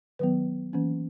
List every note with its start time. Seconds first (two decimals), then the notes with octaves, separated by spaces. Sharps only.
0.19 D#3 F#3 B3 B4
0.73 E3 A#3 C#4